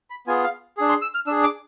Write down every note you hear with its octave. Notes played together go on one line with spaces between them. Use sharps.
B5
B3 F4 G#4 G#5
F5
D4 G#4
C6
E6
F6
D4 G#4 E6
D6